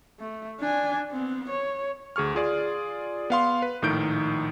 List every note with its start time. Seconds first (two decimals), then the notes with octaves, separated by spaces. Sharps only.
0.19 A3
0.60 D4 G#5
1.12 B3 C4
1.50 C#5
2.16 D2 G#4 C#6 F6
2.35 F4 G#4 D5
3.30 B3 F5 C6
3.62 B4
3.82 A#1 A2 D#3 G6 D7